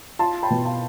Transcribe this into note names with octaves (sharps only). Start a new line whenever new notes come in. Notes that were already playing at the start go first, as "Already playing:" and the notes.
F4 A5 C6
G5 B5
B2
F5 A5